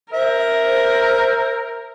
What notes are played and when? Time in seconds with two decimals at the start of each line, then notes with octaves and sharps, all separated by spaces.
0.13 A#4 C5 E5
0.62 C5